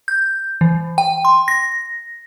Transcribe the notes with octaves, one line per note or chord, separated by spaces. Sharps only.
G6
E3
G5
C6
A#6